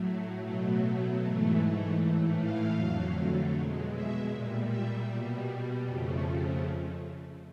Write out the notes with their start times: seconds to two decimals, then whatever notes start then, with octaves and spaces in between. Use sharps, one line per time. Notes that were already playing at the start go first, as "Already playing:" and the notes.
Already playing: A2 F#3 A3
0.42 B2 F#3 A3
1.20 G#2 E3 A3
1.97 A2 E3 A3
2.36 F5
2.75 F2 D3 F#3 A3
3.52 B2 G#3
3.90 E5
4.29 A#2 G3
4.68 E5
5.07 B2 G3
5.84 F2 C#3 F3 A3